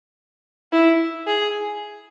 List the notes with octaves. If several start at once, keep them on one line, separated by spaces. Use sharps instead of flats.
E4
G#4